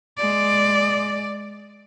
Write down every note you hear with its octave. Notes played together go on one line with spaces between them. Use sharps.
G#3 D5